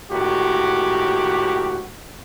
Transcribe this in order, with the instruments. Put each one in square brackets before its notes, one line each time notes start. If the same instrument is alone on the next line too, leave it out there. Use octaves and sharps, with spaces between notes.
[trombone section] C#2 A2 D#3 F#4 G4